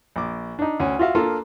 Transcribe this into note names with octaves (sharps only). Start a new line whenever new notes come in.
A#1 D6
D4 D#4
D2 C#4
F4 F#4 E5 F5
A#3 D4 F4 A4